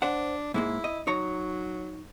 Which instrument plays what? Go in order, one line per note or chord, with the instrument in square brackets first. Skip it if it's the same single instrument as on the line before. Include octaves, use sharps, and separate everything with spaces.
[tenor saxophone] D4 [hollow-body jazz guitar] C5 F#5
[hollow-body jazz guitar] G#2 G#3 A#3 [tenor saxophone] E4
[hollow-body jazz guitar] D#5
[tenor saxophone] F#3 [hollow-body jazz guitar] D#4 C#5 A#5